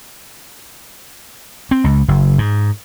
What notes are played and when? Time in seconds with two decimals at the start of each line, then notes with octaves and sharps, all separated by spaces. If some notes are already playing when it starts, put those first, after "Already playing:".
1.71 C4
1.84 C#2
2.08 F#1
2.38 G#2